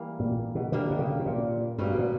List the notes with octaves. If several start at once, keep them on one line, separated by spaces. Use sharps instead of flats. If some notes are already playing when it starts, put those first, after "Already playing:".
Already playing: E3 G3 A#3
A#2
B2
D3 G3 A#3 D4 G4
B2
C#3
B2
A#2
G2 B2 G3 A#3 C#4
A#2